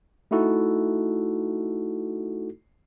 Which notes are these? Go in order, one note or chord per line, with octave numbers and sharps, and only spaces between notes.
A3 D#4 E4 F#4 A4